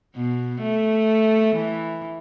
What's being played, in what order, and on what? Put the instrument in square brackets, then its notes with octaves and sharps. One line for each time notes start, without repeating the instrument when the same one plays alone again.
[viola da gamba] B2
A3
E3